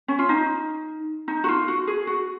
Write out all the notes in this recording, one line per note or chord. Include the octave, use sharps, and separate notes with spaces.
C#4
F4
D#4
D#4
F#4
F4
F#4
G#4
F#4